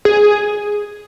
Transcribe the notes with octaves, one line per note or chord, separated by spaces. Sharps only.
G#4